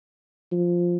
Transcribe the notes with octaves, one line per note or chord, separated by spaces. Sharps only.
F3